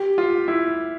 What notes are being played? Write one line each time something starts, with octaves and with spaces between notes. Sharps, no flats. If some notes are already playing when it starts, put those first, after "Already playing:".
Already playing: G4
F4
E4